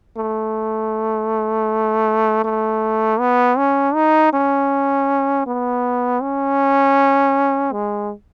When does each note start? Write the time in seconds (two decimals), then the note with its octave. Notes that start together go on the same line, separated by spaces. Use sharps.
0.17 A3
2.44 A3
3.20 B3
3.58 C#4
3.95 D#4
4.33 C#4
5.47 B3
6.22 C#4
7.72 G#3